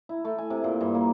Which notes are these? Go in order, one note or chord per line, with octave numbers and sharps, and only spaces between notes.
E4
A3
G#5
C3
A#2
G2
A#3